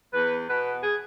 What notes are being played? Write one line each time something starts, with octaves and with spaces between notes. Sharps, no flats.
E2 B4
B2 B3 B4
G#4